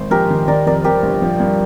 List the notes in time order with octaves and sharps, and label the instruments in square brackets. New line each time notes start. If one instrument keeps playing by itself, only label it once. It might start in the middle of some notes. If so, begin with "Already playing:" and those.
Already playing: [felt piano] G#1 [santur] C5
[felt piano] A#1 [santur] G4 A#4
[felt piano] D#3
[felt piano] D#3 [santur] A#4 D5
[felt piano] F2 [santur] A#4 D5
[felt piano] G3 [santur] G4 A#4
[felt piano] G1
F3
G2